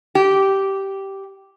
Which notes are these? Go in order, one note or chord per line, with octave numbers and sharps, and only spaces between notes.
G4